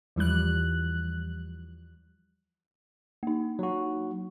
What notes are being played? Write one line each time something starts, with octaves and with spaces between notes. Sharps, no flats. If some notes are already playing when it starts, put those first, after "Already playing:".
E2 E3 F3 G3 F#6
A#3 D#4
F#3 F#4